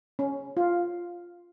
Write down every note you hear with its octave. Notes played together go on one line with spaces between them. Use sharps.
C#4
F4